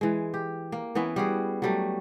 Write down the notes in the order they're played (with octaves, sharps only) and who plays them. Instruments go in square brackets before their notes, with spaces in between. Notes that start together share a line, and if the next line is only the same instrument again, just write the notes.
[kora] E3 G#3
G4
A#3
E3 B3 C#4 E4
G3 F#4 G#4
F#3 G3 A3